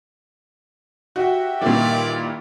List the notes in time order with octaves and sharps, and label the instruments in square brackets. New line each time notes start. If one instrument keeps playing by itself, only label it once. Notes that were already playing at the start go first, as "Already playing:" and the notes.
[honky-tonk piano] F#4 [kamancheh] G4 E5
[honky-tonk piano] A#2 E3 [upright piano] D#3 G3 A#3 [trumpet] D5